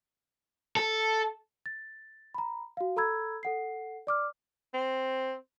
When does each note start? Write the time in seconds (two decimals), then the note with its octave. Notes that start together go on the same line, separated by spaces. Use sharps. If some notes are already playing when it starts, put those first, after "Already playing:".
0.76 A4
1.66 A6
2.35 A#5 B5
2.77 F#4 F5
2.96 A4 A#5 B5 E6 G#6
3.43 A4 F#5 C7
4.07 D5 D6 F6
4.74 C4